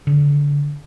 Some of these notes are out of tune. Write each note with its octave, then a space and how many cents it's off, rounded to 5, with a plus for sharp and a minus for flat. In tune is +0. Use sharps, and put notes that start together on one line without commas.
D3 -25